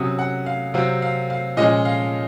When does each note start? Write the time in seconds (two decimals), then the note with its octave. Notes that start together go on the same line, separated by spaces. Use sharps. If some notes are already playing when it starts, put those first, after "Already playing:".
Already playing: C3 F#3 C#4 D#6
0.19 F#5
0.46 F5
0.74 C3 F#3 C4 F5
1.02 F5
1.30 F5
1.57 A#2 F3 G#3 C#4 D#5
1.85 F5